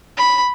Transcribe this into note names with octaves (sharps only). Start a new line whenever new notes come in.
B5